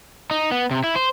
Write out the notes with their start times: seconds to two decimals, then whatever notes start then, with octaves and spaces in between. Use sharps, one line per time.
0.31 D#4
0.52 B3
0.71 C3
0.84 E4
0.95 C5